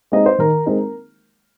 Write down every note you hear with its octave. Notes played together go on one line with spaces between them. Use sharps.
G#3 C4 D#4 D#5
C5
D#3 A#4
G#3 C4 D#4 A#4